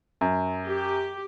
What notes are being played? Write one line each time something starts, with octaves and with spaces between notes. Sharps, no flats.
F#2
G4